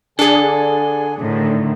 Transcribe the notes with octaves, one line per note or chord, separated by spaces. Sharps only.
D3 D4 G#4 A4 G#5
A2 D3 D#3